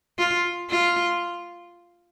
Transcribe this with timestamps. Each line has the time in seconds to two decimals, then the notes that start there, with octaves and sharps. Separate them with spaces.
0.19 F4
0.70 F4